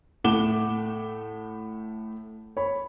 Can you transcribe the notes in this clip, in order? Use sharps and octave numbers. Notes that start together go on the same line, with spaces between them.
A2 A3 F#5 D6 E7 G7
C#5 B5